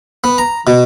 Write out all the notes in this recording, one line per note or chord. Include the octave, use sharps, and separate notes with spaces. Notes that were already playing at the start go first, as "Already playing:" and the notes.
B3
A#5
B2